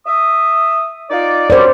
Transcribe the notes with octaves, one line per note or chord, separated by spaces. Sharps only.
E5 D#6
D#4 F4 D5
F#2 G3 C5 D5